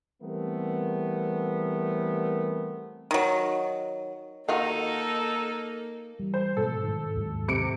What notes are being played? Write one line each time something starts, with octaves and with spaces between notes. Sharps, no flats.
E3 G3 A3 B3 C4 A#4
D#3 F#3
D#3 A#3 D#4 F4 F#4 A4
E3 G3
C5
G#2 B2 F3 A4
G#2 D#3
D#2 G#2 F#3
C3 C#7 D7